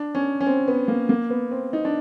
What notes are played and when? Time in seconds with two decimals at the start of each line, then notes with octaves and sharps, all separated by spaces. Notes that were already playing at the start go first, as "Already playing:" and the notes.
Already playing: D4
0.15 C#4
0.40 C#4
0.46 C4
0.68 B3
0.88 A#3
1.09 A#3
1.30 B3
1.51 C4
1.73 D#4
1.85 D4